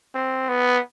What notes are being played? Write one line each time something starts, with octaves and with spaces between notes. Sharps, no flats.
C4
B3